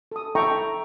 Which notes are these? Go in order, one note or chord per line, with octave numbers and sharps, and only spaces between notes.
A4 D#6
E4 A4 E5 G5 A#5 C#6